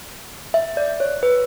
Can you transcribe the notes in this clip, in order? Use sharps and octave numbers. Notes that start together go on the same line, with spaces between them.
E5
D5
C#5
B4